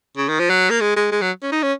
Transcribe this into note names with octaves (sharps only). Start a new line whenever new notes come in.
C#3
D#3
F3
F#3
A#3
G#3
G#3
G#3
F#3
C#4
D#4
C#4